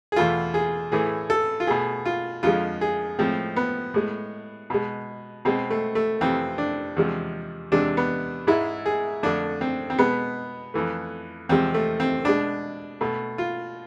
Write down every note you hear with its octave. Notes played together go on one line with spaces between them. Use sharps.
G#4
E2 B2 A3 F4
G#4
A2 E3 A3 G#4
A4
F4
B2 A3 G#4
F4
F2 D3 F3 G#3 F4
G#4
A2 F3 G#3 C4
B3
A2 G#3
B2 G#3
B2 G#3 C4
A3
A3
F2 C3 E3 A3 C4
D4
E2 C3 F3 G#3
E2 C3 G#3 D4
B3
G#2 G#3 E4
G#4
F2 D3 A3 D4
C4
C4
B2 G#3 B3
F2 E3 A3
E2 C3 F3 G#3 C4
A3
C4
B2 G#3 D4
B2 A3
F4